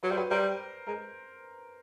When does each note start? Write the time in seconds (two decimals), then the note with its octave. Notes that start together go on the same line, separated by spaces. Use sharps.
0.03 F#3 B4
0.11 G3 C5
0.17 F#3 B4
0.31 G3 A#4 C5
0.87 G#3 A#4